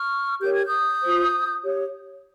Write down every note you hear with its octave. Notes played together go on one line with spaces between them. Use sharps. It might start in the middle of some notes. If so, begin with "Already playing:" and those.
Already playing: C#6 F6
G4 A#4 C#5 G6
G#6
D#6 G6
F4 C5
G4 C#5